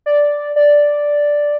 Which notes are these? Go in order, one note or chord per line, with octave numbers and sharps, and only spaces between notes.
D5
D5